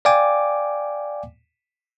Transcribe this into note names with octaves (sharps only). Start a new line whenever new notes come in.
D5 F5 G5 G#5 D6